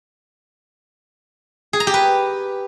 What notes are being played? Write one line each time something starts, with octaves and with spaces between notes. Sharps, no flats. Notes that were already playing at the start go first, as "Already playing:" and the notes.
G#4
A#5
G4
B4